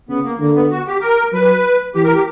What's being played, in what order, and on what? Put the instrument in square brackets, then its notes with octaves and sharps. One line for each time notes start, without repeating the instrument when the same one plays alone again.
[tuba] C#3 [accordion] B3
[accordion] A#3
[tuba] D3 [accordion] A#3
[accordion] B3
F#4
G4
A#4
[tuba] F#3 [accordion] B4
[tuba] E3 [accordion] G4
[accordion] A#4
G4